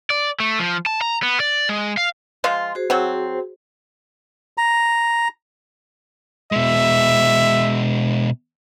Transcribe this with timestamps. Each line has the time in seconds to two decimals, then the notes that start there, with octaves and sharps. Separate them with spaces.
0.10 D5
0.40 A3
0.59 F3
0.86 A5
1.01 A#5
1.23 B3
1.40 D5
1.69 G#3
1.97 F5
2.44 F3 G#3 F4
2.75 F#4 G#4 C5
2.90 F#3 C4
4.58 A#5
6.52 B2 G#3 E5